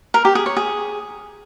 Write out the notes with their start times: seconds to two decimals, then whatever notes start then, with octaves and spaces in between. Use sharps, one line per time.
0.14 A#4
0.25 G4
0.35 G#4
0.46 C#5
0.57 G#4